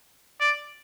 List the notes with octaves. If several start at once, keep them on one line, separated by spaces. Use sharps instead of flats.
D5